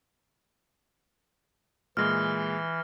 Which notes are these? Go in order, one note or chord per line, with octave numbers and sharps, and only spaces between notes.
A#2 E3 G#3 F6 A#6